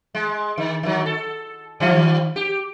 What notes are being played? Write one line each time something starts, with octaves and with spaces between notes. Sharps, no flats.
G#3
D#3
D#3 F#3
A4
D#3 F3 G3
G4